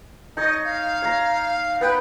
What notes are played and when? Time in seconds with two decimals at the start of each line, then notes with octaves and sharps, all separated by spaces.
0.37 D#4 C#5 D#5
0.65 F5
1.02 C#5 A#5
1.81 B3 B4 G5